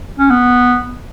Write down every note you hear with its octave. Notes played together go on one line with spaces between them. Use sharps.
C#4
B3